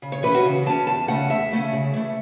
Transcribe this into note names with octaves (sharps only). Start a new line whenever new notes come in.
C#3
C#5
E3 C#4 B4
F#4
C#3
E3 C#4 A5
E2 A5
C#3 A3 C#4 F#5
E2 E5
C#3 A3 C#4
C#3
E3 A3